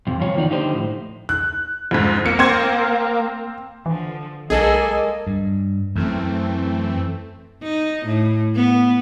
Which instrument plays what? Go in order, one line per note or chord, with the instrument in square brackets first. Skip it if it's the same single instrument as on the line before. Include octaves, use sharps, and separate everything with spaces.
[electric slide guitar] F2 C3
G2 F3 F4 C#5
D#3 A#3 D#4 D5
D3 F3 D#4 G4 C5
A2
[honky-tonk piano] F#6
F2 G#2
[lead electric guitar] A#3 [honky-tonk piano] C#7
[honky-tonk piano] C4 C5 G#6
[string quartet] D3 F3 [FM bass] E3
[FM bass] B1 [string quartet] G#3 A#3 G#5 [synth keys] G#4 A4 [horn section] D#5
[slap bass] G2
[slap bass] F#2 [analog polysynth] E3 A3 C4
[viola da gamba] D#4
A2
B3